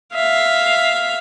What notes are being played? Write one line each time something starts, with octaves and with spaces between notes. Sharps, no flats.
E5 F5